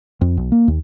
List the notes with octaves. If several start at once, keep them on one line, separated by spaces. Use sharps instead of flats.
F2
B1
A#3
D#2